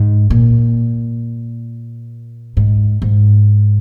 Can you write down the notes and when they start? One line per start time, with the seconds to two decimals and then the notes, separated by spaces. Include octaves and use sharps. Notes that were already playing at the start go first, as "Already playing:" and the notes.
Already playing: G#2
0.30 A#2
2.57 G#2
3.02 G#2